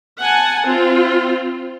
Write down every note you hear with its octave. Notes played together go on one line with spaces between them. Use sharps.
F#5 G#5 A5
C4 F4